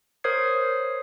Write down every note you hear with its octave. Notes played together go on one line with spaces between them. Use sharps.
A#4 C5 C#5 D#6 G#6 C7